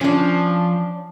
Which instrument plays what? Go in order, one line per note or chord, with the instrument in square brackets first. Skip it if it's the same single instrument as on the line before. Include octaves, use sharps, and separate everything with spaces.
[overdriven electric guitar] F3 [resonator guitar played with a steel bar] C#4 D4